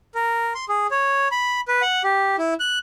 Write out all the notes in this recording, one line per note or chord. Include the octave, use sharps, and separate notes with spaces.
A#4
C6
G#4
C#5
B5
B4
F#5
G4
E4
F#6